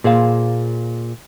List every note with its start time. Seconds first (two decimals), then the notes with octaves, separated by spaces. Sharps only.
0.04 A#2 G#4 C5 F5